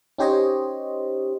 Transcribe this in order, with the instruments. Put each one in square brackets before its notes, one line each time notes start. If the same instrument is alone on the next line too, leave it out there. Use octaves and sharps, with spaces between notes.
[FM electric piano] C#4 D#4 G4 C5 C#5 D#5